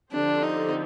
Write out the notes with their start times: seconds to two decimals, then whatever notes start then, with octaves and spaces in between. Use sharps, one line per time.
0.11 D3 F3 C4 D4 G4 C5
0.42 D#4